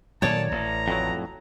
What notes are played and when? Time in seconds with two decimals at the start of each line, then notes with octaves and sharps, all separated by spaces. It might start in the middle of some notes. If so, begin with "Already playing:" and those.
0.22 A#2 D#3 F#3 C#5 D5 A5
0.52 A1 A#5
0.88 F2 A2 F#3